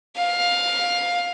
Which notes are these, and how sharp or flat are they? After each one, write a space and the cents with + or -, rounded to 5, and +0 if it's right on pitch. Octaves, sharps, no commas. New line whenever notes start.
F5 +15